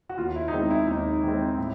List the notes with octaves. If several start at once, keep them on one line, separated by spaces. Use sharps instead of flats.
F#4
D#2 F4
E4
D#4
D#3 G#3 C4 E4
E4
D#2 D#4
D#3 G#3 C4
A2